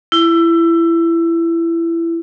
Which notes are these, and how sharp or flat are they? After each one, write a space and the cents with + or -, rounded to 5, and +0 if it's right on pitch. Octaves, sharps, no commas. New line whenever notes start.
E4 +20